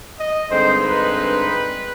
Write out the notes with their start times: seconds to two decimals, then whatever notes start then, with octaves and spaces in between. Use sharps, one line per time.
0.18 D#5
0.49 G2 D3 G#3 C4 D#4 C5
0.82 B4